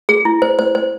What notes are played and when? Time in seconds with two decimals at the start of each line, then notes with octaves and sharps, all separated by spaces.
0.09 G#4
0.25 E4
0.42 C5
0.59 C5
0.75 C5